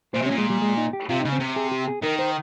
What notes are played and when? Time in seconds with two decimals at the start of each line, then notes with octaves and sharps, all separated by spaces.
0.14 A#2 C5
0.22 C3
0.26 C#4
0.31 A#2
0.38 G#3
0.50 G3
0.62 G#3
0.77 D#4
0.93 G4
1.09 C3 F4
1.20 D#4
1.25 C#3
1.33 C4
1.40 C3
1.56 G#4
1.72 G4
1.87 G#4
2.03 D#3 A#4
2.19 C5